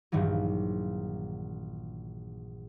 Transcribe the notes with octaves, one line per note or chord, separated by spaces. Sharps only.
A#1 G2 D#3 E3 F#3